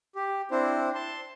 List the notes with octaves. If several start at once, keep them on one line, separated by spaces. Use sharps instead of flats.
G4
C4 D4 E4 C5
A5 C6